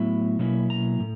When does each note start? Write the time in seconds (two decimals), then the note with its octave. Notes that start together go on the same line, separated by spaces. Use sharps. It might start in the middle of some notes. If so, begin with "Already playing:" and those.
Already playing: A2 F#3 B3 E4
0.39 B2 F#3 A#3 C#4 E4
0.70 A#5
1.00 A2